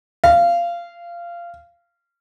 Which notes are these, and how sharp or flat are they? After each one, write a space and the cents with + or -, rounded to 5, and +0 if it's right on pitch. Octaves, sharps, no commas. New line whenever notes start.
F5 -20